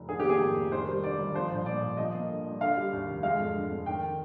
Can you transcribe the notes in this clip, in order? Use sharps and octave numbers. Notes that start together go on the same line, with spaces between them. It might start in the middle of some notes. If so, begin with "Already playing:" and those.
Already playing: F1
D#3 G#4
A#3 G4
G#4
F2
F1
D#3 C5
G3
G2 D5
G1
F3 C5
A#1
A#2 D5
A#1
F3 D#5
A#3
D3
G2
D3 F5
G3
D#2
F1
G#3 F5
F2
D3
F2
D#3 G5